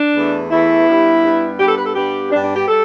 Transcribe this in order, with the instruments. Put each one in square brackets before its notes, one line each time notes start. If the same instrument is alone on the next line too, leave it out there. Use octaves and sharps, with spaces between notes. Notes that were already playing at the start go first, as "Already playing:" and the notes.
Already playing: [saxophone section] D4
E2 E3 A3
E2 E3 A3 E4
G2 G3 B3
G2 G3 B3
G2 G3 B3 G4
A4
B4
A4
G2 G3 B3 G4
G2 G3 B3 D4
D4
G4
G3 A4